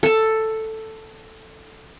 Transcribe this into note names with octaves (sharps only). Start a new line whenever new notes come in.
A4 A5